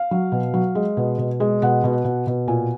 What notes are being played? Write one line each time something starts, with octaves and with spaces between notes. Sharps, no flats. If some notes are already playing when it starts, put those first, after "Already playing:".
Already playing: F5
F#3
B2
F#3
G#3
B2
B2
G#3
B2 F#5
B2
B2
B2
A#2 G#5